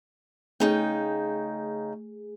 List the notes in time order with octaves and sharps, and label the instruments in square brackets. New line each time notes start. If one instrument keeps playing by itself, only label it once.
[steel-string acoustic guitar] C#3 D#4 G5 [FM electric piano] A3 G#4